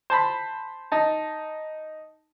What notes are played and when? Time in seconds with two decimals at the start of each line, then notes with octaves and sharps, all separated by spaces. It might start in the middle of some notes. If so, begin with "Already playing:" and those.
0.10 C5 A5 B5
0.92 D#4 A5